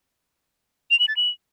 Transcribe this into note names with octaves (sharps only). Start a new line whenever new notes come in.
F7
F#7
A6
F#7